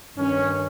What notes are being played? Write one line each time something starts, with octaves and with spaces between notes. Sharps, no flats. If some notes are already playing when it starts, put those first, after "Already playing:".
G2 D#3 C#4